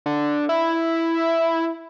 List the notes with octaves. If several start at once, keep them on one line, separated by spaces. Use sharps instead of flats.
D3
E4